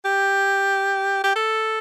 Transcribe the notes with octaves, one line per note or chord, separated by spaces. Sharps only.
G4
G4
A4